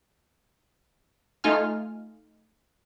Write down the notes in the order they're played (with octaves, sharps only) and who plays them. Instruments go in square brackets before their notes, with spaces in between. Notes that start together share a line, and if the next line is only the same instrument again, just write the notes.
[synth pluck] A3 D#4 F4 G#5 F6